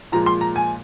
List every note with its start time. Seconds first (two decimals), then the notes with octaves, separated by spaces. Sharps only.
0.12 A#2 F3 G#3 A#5
0.26 C6
0.41 A#5
0.56 G#5